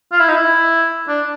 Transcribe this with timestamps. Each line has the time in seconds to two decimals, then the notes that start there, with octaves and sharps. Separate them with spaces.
0.12 F4
0.20 E4
0.28 D#4
0.36 E4
1.08 D4